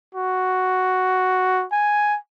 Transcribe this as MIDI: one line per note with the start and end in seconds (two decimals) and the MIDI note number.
0.15 1.65 66
1.73 2.17 80